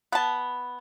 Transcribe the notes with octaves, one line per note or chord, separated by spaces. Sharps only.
B3 A5